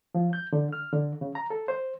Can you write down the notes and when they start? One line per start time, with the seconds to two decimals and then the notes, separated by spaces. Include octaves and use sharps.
0.15 F3
0.33 G6
0.53 D3
0.73 F6
0.92 D3
1.21 C#3
1.35 A#5
1.50 A4
1.68 C5